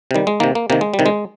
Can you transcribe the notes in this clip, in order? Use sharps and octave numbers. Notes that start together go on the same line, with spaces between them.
C3 D#3 G3
G#3
C3 D#3 A#3
A#3
C3 D#3 A#3
G#3
G3
C3 D#3
G#3